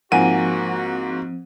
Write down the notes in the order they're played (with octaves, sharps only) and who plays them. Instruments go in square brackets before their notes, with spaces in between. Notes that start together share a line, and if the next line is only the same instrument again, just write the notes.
[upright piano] G#2 A#3 D#7 [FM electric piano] F3 C4 [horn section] F#4 [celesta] F#5 G#5